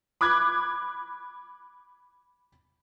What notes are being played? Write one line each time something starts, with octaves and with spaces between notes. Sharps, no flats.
B5 D6 F#6 G#6